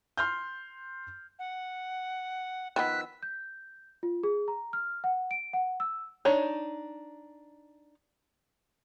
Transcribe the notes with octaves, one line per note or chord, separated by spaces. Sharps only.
C6 F6 G6
F#5
D#3 F3 B3 E6 F#6 B6
G6
F4
G#4
A#5
F6
F#5
D7
F#5
E6
D4 D#4 C#5